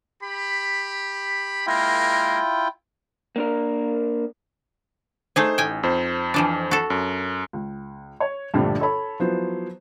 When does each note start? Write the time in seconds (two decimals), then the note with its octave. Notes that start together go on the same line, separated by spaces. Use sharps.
0.23 G4 B5
1.66 G#3 A#3 E4 F4 A#4 G5
3.36 A#3 D4 A#4
5.36 A3 D#4 G#4 C5
5.58 A1 G5 G#5
5.83 F2 C5
6.34 E3 F3 D4
6.71 F#4 A4
6.90 F#2
7.53 C#2
8.20 C#5
8.54 A#1 G2 D3 F3 G3 A3
8.80 A4 C#5 B5
9.20 F3 F#3 B3 E4 C5